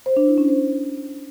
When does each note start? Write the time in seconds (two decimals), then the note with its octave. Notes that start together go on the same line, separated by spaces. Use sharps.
0.06 C5
0.17 D4
0.27 E4
0.38 C#4
0.48 C5